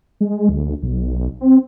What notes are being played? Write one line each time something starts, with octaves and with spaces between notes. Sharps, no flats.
G#3
D2
B1
C4